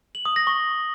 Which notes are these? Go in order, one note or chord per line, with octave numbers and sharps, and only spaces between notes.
F#7
D#6
A#6
C#6